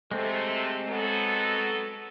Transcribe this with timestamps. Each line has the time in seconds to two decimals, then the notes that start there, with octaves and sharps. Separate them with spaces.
0.11 C3 G#3 A3 C4
0.88 F#3 B3 A4